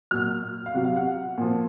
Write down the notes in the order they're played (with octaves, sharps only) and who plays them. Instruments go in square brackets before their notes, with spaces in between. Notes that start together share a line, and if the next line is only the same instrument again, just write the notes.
[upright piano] A#2 F#3 F6
F5
C3 F#3 F#5
F5
F#5
A#2 F3